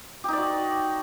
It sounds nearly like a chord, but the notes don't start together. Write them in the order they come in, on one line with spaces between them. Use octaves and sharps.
G4 D#4 D5 F#4